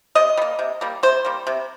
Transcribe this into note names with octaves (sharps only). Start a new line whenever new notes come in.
C3 D#5
G3
A#3
C3
G3 A#3
C3 C5
G3 A#3
C3